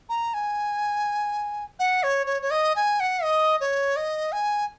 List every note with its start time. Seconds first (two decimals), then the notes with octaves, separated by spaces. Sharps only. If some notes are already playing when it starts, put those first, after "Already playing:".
0.09 A#5
0.34 G#5
1.79 F#5
2.03 C#5
2.27 C#5
2.42 C#5
2.51 D#5
2.76 G#5
3.00 F#5
3.23 D#5
3.61 C#5
3.96 D#5
4.32 G#5